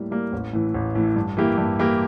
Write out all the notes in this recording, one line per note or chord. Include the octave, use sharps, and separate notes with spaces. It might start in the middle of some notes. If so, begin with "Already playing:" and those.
Already playing: A2 G3 A#3
G3 A#3
A1
A2 E3
A1
A2 E3
G2
E3 A#3 E4 G4
G2
E3 A#3 E4 G4